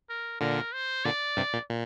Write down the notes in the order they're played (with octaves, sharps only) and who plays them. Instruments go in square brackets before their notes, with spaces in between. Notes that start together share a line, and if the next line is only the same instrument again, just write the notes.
[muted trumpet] A#4
[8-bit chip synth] A#2 D3 [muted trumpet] A#4
[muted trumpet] C5
[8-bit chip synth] A#2 D3 [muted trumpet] D5
[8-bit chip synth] G2 C3
A#2
A#2